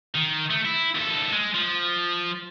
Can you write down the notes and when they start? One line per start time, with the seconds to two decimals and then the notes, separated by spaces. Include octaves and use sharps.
0.15 D#3
0.51 A3
0.66 E4
0.95 D#2 A4
1.33 G#3
1.54 F3